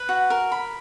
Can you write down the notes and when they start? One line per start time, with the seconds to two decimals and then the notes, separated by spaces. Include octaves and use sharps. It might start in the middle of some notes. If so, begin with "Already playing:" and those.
Already playing: B4
0.09 F#4
0.30 A#4
0.52 B5